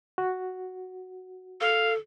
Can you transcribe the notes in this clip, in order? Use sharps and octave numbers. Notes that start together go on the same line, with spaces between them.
F#4
A4 F5